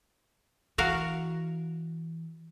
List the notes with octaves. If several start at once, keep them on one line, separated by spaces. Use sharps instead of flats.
E3 F#4 A#4 F5